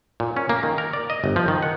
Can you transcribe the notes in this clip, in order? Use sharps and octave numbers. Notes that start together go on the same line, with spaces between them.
A#2
C#4
A#3
D#3
A#4
D5
D#5
G1
F3
D#3
F#5